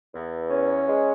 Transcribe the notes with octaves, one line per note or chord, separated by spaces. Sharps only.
E2
C#4
G#3